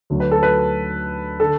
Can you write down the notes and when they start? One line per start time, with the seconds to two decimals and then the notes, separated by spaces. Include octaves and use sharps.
0.10 D2 D3 F#3
0.20 B4
0.31 A4
0.43 B4
1.40 D3 A4